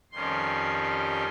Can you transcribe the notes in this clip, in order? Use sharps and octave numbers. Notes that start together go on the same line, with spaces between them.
F2 D#3 G3 C#4 C6
C6